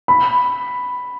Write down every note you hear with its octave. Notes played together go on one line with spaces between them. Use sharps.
B5